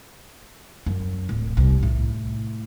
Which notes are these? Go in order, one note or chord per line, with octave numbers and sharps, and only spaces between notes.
F#2
D1
C2
A2